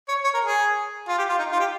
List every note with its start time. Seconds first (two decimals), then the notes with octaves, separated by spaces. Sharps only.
0.09 C#5
0.24 C#5
0.34 A#4
0.45 G#4
1.08 F4
1.18 G4
1.29 F4
1.38 D#4
1.52 F4
1.59 G4